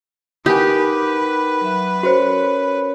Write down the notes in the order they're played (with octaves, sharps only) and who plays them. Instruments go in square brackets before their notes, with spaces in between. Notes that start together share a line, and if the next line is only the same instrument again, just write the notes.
[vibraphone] D#4 A#4 F#5 [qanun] G4 [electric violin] B4 [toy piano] G#5 D#6
[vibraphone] F#3 E5
[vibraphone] C#4 A#4 C#5 [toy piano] F#4 C5